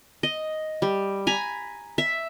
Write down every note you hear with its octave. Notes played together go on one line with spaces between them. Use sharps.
D#5
G3
G#5 A#5 B5
E5